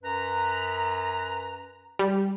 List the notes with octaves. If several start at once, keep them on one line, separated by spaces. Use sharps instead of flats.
F#2 B4 A#5
G3